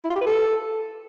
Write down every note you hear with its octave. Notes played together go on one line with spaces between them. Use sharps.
E4
F4
G4
B4
A4